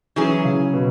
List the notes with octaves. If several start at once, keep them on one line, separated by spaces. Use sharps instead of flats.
E3 F#3 C#4 G#4
C#3
B2